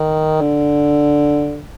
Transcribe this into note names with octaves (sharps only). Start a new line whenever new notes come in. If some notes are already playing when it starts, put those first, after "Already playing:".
Already playing: D#3
D3